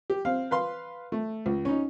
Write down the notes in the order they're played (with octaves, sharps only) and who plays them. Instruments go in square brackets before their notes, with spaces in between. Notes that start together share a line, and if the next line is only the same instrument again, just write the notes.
[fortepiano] G4
C4 F5
B4 F5 C6
A3
C#2
C#4 D#4